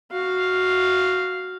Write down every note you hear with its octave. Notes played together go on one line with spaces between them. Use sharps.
F#4 F5